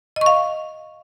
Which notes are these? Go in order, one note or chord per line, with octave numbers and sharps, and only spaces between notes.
D#5 F5 C#6